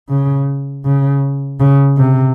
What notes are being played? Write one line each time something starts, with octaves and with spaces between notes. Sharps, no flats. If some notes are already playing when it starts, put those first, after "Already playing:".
C#3
C#3
C#3
C3